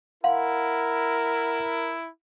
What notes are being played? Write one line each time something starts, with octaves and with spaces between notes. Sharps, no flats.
E4 A#4 F5 F#5 C6